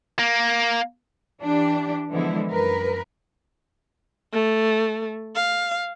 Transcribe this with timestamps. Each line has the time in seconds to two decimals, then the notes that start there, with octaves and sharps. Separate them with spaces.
0.19 A#3
1.42 E3 D4 G4
2.10 D3 E3 F3 G#3 B3 E4
2.51 F#2 A#4 B4
4.33 A3
5.36 F5